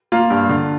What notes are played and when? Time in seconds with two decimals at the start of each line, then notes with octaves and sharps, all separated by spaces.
0.12 A#3 F4
0.30 G2
0.49 D3